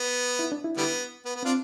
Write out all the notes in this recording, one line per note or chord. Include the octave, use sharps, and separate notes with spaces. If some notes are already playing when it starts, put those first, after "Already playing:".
Already playing: B3
E4
D4
E4
D3 G3 B3
B3
B3
C4 D4 F4